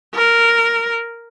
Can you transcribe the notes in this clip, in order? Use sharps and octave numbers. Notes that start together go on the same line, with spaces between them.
A#4